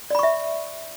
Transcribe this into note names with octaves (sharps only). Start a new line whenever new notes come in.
D5 E5 B5 C#6